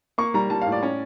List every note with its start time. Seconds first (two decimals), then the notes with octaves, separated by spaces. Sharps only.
0.18 A#3 C#6
0.34 G3 A#5
0.50 G3 A5
0.61 A2 F5
0.72 D5
0.83 C#4